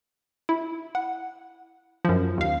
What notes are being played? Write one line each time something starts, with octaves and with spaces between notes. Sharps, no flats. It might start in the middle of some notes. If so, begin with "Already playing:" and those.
E4
F#5
F#2 F3
D#2 F5